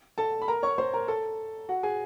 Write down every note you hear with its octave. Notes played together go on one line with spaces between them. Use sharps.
A4 A5
B5
A#4 A#5
C#5 C#6
C5 C6
A#4 A#5
A4 A5
F#4 F#5
G#4 G#5